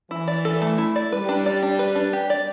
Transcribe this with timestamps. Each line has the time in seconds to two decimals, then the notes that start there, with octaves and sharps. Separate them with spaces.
0.11 E3 E4
0.28 D5
0.45 A4
0.62 A3
0.78 E4
0.96 D5
1.12 G3 B4
1.29 D4
1.46 D5
1.63 D4
1.79 B4
1.95 D4
2.13 G4
2.30 D5